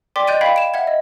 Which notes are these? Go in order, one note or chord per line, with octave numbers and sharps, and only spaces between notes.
D5 G5 C6 D6 B6
D#5 F#6 G6 A6 D7 D#7
F5 G5 B5 G#6 B6
D7 E7
E5 F#5 G#6
D#5